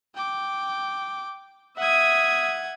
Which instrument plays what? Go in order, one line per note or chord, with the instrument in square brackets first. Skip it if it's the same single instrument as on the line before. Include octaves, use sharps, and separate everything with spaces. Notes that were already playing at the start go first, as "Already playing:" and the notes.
[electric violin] G5 D6
[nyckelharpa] E5 D#6 [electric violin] F#5 G#6